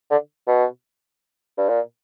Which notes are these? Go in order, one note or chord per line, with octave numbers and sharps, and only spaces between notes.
D3
B2
G2
A#2